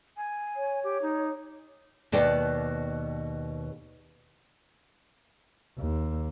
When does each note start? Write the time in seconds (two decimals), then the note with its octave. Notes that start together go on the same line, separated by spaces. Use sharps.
0.17 G#5
0.56 C#5
0.84 G4
1.02 D#4
2.12 D#2 B2 D5 G5
5.78 D#2